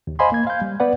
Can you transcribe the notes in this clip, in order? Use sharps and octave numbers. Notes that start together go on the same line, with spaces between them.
D#2
C5 D#5 F5 G#5 B5 C6
A#3 G#6
F5 G6
G3
B3 B4 D5 F#5